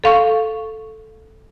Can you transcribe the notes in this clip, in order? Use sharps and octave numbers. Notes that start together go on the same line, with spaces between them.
A4 F5 C#6